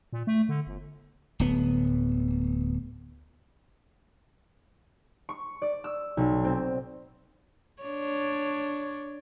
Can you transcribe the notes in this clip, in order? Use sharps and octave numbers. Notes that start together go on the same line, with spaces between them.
A#2
A3
D3
G1
D1 B3
C#6
D5
E6
B1
C4
D4 C#5